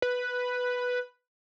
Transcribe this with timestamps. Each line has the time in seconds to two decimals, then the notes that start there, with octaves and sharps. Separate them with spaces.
0.02 B4